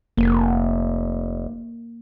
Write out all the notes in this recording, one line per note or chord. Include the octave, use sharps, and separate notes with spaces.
F1 A#3